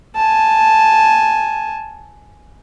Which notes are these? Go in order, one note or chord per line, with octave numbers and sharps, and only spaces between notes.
G#5 A5